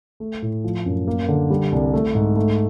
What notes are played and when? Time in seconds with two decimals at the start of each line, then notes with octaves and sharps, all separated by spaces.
0.20 A3
0.42 A2
0.64 F3
0.86 F#2
1.08 A#3
1.28 D3
1.50 G3
1.72 C2
1.94 A3
2.15 G#2
2.36 A3